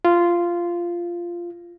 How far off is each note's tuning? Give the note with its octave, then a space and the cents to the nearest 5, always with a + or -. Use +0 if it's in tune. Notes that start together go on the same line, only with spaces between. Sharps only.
F4 -10